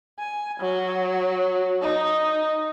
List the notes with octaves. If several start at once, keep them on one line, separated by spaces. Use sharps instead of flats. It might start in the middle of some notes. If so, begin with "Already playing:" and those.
G#5
F#3
D#4